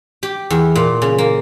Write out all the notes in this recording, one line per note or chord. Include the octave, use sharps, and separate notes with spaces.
G4
E2
A#2
C#3
A#3